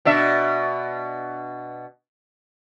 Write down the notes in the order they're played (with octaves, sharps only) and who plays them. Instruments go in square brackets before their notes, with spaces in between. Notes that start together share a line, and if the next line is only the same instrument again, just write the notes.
[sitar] B2 D4 E5